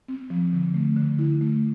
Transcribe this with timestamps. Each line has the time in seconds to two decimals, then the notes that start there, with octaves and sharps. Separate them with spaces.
0.08 C4
0.30 F3
0.53 D3
0.74 A3
0.96 D3
1.19 E4
1.41 A3